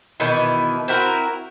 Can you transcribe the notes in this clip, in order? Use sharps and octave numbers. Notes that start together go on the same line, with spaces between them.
B2 D#3 E3
C4 E4 F#4 A#4